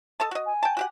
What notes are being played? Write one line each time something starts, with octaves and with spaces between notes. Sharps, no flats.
A4 D#5 A5
F#4 D#5
G#5
G5 A5
F#4 G4 F#5